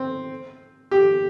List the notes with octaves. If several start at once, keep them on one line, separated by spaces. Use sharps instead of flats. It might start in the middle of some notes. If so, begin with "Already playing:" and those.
Already playing: C4
G4